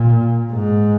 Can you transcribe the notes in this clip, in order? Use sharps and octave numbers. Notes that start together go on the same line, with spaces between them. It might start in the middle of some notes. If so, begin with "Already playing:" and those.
Already playing: A#2
G#2